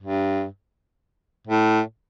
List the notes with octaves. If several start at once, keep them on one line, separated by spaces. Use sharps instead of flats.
G2
A2